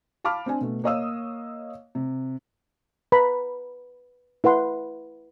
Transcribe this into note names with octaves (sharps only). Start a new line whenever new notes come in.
F5 A5 B5 D6 F6
C4 D4 G#5
B2 A3
A#3 C#5 D#5 F5 D#6 E6
C3
B4 A#5 B5
E4 B4 F#5 C6